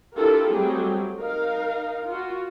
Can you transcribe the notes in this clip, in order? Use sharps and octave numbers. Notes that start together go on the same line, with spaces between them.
D4 E4 F4 G4 A4 A#4
F#3 G3 A3 C4 G4 G#4
D#4 A#4 F5
F4 F#4